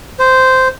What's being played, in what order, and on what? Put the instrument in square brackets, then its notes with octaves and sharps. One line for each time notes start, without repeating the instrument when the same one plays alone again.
[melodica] C5